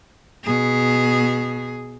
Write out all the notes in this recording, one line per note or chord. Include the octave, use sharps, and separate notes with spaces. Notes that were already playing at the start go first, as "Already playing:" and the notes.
B2 G#4